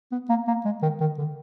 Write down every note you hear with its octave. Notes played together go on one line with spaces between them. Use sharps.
B3
A#3
A#3
G#3
D#3
D#3
D3